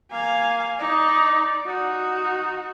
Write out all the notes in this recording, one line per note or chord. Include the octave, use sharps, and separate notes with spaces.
A#3 F5 G#5
D#4 D5
D#4 F#4